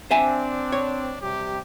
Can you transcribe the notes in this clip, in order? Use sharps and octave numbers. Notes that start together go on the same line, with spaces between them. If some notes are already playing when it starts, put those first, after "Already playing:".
C4 D4 C5 E5 G#5
C#5
C3 G3 G4